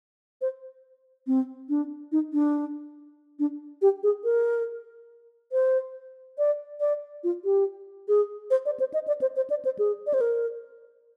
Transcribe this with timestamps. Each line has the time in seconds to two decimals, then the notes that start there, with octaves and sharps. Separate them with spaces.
0.41 C5
1.27 C4
1.69 D4
2.12 D#4
2.33 D4
3.39 D4
3.82 G4
4.03 G#4
4.24 A#4
5.52 C5
6.38 D5
6.80 D5
7.24 F4
7.45 G4
8.08 G#4
8.51 C5
8.66 D5
8.80 C5
8.94 D#5
9.08 D5
9.22 C5
9.36 C5
9.50 D5
9.65 C5
9.79 G#4
10.07 D5
10.14 C5
10.21 A#4